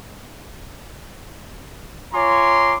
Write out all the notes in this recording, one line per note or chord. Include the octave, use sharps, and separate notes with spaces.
F4 C#5 G#5 A#5 C6 D6